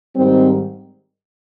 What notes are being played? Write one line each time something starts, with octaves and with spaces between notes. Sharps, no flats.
G#2 D#3 G3 C4